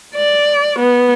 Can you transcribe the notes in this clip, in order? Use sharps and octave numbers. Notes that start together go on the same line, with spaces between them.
D5
B3